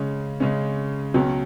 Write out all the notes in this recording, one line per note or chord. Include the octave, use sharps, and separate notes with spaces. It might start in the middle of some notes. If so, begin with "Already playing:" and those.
Already playing: C#3 G#3 C#4
C#3 G#3 C#4
C#2 B2 F#3 C#4